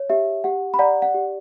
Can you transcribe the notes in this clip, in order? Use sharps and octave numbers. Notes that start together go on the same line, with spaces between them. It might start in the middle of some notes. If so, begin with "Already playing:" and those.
Already playing: C#5
G4 E5
G4 F#5
B5
D5 F#5 A#5
F#5
G4